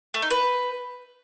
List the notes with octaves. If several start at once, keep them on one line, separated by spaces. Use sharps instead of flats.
A3
D#4
B4